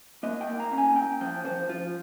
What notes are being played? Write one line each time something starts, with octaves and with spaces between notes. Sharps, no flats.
A#3 D#5
G5
A#3
A#5
C#4
G#5
C#4 G5
F3 G5
F3 C5
F3 F4